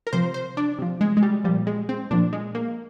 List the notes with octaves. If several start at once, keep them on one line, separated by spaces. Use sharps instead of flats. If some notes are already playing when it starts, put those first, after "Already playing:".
A#4
C3 F3 C5
C5
D4
C3 F3
G#3
G#3
G3
A#2 F3 G3
G#3
C4
A#2 F3 D4
G#3
A#3